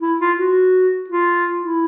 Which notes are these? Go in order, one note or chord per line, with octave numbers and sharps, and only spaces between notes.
E4
F4
F#4
F4
E4